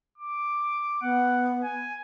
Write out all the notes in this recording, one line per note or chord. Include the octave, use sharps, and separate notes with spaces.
D6
B3 F#5
G#5